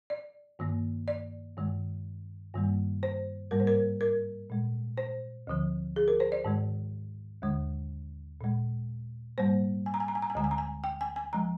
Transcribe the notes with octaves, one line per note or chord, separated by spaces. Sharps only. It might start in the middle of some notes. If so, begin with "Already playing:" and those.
D5
G2 D#3 A#3
D5
G2 D#3 G#3
G2 D#3 G3 A#3
C5
G#2 G3 A#3 A#4
C5
A#4
A#4
A#2 G#3
C5
D2 D3 F3
G#4
A#4
C5
D5
G#2 D#3 G#3
D#2 D3 G#3
A#2 G#3
G#2 G3 A#3 C5
G#5
A#5
G#5
A#5
G#5
A#5
G#5
D2 D3 G#3 A#5
G#5
A#5
G#5
G5
G#5
G#5
F3 G#3 A#5